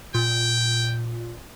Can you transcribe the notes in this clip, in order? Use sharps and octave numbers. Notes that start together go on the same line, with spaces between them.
A#2 G5